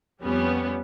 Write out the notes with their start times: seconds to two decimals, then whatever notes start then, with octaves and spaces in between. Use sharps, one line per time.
0.21 F2 G3 B3 C#4